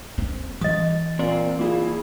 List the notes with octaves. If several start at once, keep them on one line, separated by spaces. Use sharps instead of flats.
C4
E3 D#5 D#6
A#2 C4 D5
A#3 E4 F4 G#4